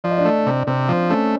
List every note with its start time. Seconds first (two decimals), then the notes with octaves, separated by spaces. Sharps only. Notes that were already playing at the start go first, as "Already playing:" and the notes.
0.04 F3 D5
0.11 D#5
0.18 D4 D5
0.25 A3
0.46 C3
0.67 C3 C4 C5
0.89 F3
1.10 A3 C#4 C#5